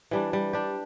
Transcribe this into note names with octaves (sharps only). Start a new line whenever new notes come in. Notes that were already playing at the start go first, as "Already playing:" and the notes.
E3 G3 D4
G3
D4 G4